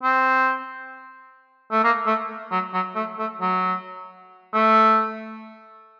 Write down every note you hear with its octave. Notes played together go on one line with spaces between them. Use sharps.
C4
A3
A#3
A3
F#3
F#3
A3
A3
F#3
A3